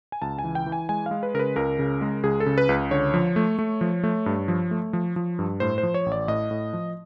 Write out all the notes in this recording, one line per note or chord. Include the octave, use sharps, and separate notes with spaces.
G#5
C#2 A5
G#5
E3
G5
E3
G#5
G#3 G#5
G#3 F5
B4
C#3 A#4
B4
C#2 A#4
C#3
G#3
C#2 G#4
A4
C#3
B4
C#2
D3 C#5
F3
A3
A3
F3
A3
G2
F3
A3
F3
F3
G2
A2 C5
C5
F3
C#5
A1
D5
A2 D#5
A2
F3